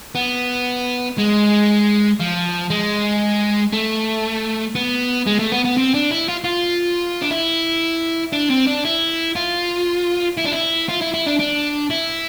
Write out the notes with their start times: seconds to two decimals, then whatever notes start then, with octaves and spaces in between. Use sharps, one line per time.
0.15 B3
1.18 G#3
2.20 F3
2.70 G#3
3.73 A3
4.75 B3
5.26 G#3
5.39 A3
5.52 B3
5.65 B3
5.77 C4
5.94 D4
6.11 E4
6.29 F4
6.44 F4
7.22 D4
7.31 E4
8.33 D4
8.50 C4
8.67 D4
8.84 E4
9.35 F4
10.38 E4
10.45 D4
10.52 E4
10.89 F4
11.01 E4
11.14 E4
11.27 D4
11.40 D4
11.91 E4